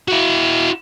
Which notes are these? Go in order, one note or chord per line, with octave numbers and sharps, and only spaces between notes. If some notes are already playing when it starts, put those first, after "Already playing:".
E4 F#4